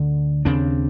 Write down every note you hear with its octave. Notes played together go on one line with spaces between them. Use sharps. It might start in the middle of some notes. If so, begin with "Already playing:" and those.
Already playing: D2 D3
D#2 C#3 C4 D4